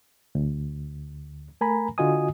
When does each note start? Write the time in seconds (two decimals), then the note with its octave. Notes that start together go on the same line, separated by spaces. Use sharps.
0.35 D2
1.61 A3 A#4 G#5 A#5 B5
1.98 D3 F4 F#4 D#5 G#5 D#6